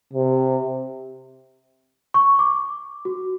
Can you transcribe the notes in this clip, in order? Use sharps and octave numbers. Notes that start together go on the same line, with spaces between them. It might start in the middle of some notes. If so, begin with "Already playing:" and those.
C3
C#6
D6
F#4